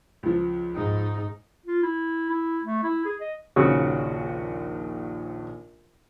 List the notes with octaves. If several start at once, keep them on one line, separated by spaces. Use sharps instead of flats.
C#2 F3
G#2 D#4
F4
E4
E4
A3
E4
G#4
D#5
A#1 D#2 C#3 F#4 C5